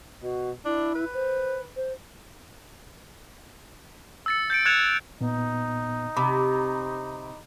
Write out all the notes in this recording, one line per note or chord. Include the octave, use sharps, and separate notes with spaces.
B2 F#4
D4 E4
B4
C5
C5
E6 A6 C#7
G6 A6 C#7 D7
F#6 G#6 A6 C#7 E7 F7
A#2 B3 D#4
C3 B5 D6